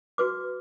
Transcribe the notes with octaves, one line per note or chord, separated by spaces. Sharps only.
F#4 B4 D6